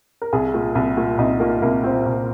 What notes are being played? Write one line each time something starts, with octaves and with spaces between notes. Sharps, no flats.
A#4
C2 G#4
A#2
C2
A#2
C2 D#4
A#2 A#3
C2 A#3
A#2 C4
C2